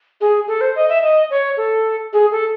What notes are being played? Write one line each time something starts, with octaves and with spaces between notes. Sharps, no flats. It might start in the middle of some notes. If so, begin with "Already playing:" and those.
G#4
A4
C5
D#5
E5
D#5
C#5
A4
G#4
A4